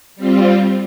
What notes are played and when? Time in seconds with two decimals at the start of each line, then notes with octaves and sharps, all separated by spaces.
0.16 G3 C4 F4